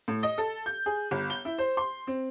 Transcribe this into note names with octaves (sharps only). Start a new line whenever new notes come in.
A2
D#5
A4
G6
G#4
G1
G7
E4
C5
C6
C4